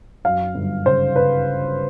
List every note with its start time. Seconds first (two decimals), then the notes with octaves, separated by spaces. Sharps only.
0.24 F#2 F5
0.55 G1
0.85 C#3 C5
1.16 C#3 B4